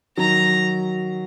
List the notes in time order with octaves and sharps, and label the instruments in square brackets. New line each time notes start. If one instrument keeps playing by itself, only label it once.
[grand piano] D#3 F#3 [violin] A#5